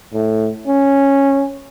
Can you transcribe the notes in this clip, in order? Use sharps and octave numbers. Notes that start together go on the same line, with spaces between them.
A2
C#4